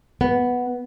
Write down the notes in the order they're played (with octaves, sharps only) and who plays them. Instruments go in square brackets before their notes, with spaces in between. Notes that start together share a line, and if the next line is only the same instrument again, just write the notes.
[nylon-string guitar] B3